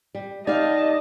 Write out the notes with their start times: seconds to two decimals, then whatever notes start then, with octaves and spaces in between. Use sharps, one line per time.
0.15 G3
0.47 G3 D#4 D5 D#5 F5 A5